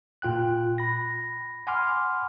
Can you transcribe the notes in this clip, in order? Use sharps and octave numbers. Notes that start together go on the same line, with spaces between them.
A#2 F4 G5 F#6
B5 A#6
F#5 G#5 B5 C6 D6 F6